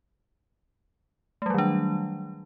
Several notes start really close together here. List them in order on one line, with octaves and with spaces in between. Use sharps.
A3 G3 F#3 D#3 D4